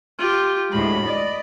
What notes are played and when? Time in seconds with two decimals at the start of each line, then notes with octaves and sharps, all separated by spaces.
0.18 F4 G4
0.72 D2 A2 G#3 B5
1.04 D5 D#5